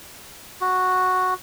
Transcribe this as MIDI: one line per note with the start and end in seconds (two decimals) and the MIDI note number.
0.61 1.34 66